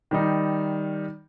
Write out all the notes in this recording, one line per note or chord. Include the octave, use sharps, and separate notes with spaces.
D#3 G3 D#4